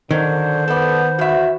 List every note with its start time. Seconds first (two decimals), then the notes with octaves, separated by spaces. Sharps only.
0.11 D3 D#3 F#3 C5
0.68 B3 A4 D5
1.19 E2 F#4 E5